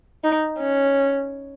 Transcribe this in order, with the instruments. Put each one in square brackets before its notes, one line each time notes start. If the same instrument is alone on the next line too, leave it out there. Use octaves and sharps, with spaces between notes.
[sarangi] D#4
C#4